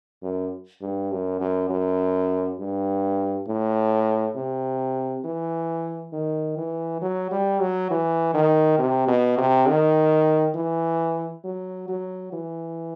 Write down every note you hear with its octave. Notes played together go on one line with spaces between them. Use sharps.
F#2
G2
F#2
F#2
F#2
G2
A2
C3
E3
D#3
E3
F#3
G3
F#3
E3
D#3
C3
B2
C3
D#3
E3
F#3
F#3
E3